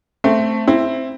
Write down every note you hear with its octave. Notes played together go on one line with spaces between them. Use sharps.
A3 C4
C4 E4